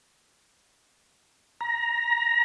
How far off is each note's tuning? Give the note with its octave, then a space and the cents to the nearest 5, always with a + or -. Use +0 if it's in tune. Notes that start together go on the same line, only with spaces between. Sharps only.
A#5 +20